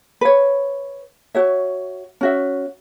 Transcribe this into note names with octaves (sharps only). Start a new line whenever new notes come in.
B4 C#5
F#4 C#5 E5
C#4 F#4 E5